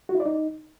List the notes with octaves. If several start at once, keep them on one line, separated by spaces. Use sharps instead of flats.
F#4
E4
D5
D#4